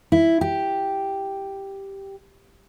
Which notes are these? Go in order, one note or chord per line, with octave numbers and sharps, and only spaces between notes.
E4
G4